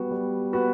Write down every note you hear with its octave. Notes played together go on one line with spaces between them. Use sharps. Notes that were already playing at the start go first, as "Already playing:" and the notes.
Already playing: G3 B3 F#4 B4
G3
B3 F#4 B4